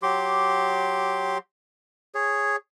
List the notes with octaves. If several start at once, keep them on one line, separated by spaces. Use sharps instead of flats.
F#3 G4 C6 D6
G#4 C#5